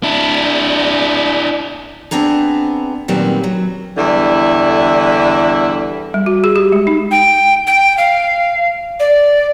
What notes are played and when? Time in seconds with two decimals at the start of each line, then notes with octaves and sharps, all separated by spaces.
0.03 D4 E4
2.11 B3 C4 D4 G#4 A#5
3.08 A#2 D#3 F#3 G3 B3 C4
3.44 F#3
3.96 E2 D3 G3 E4
6.14 G3
6.26 F#4
6.44 G#4
6.56 G4
6.72 G#3
6.87 D#4
7.11 G5
7.67 G5
7.98 F5
9.00 D5